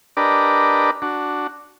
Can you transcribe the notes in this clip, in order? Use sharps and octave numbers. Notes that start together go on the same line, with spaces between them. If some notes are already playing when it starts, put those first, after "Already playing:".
D4 G4 A#4 B4 D5 D#5
D4 F#4